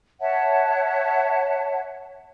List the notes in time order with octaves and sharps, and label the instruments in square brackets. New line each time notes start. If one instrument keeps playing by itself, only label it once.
[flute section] C#5 E5 F#5 A5